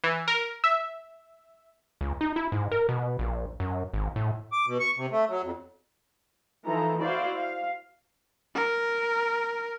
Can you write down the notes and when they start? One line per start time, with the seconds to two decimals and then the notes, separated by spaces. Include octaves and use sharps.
0.04 E3
0.28 A#4
0.64 E5
2.01 C#2
2.21 D#4
2.36 E4
2.52 G#2
2.72 A#4
2.89 B2
3.19 A#1
3.60 F#2
3.94 G#1
4.16 A2
4.52 D6
4.66 B2
4.80 C#6
4.97 C3
5.11 A3
5.29 F#3
5.43 F2
6.66 E3 F3 D#4 A4 A#5
7.00 E4 F#4 C5 D5 F5
7.34 F5
8.55 A#4